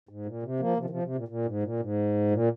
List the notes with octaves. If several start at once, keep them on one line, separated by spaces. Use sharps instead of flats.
G#2
A#2
C3
F3 A#3
C3 F3
D#3
C3 F3
C3
A#2
A#2
G#2
A#2
G#2
A#2